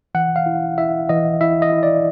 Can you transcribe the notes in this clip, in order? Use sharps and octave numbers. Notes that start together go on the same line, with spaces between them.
E3 F#5
F5
E4
E4 E5
E3 D#5
E4 E5
D#5
E4
D5